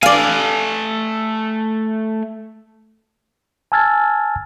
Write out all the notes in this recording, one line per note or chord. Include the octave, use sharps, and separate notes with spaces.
A3 D5 F5 G#5
G#5 A5 E6 F6 G#6 A6